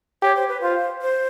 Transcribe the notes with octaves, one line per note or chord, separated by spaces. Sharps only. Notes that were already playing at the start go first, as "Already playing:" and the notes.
G4 C#5
C5
B4
F4 C5
C5